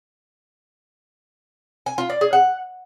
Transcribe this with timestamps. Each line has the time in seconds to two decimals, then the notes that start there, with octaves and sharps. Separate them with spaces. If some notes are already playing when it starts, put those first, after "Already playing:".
1.86 G#5
1.98 F4
2.10 D5
2.21 G#4
2.33 F#5